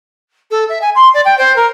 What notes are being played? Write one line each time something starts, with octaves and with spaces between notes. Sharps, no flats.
A4
E5
G#5
C6
D5
G5
C5
A#4